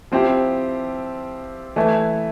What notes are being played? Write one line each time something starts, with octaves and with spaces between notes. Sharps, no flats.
F3 C4 E4 G4
E3 A3 E4